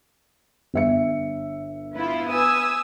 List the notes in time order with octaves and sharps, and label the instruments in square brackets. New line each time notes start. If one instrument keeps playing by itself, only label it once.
[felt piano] G1 E5 C#7
[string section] B3 E4 F4
[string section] B4 G#5 [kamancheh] D#6 E6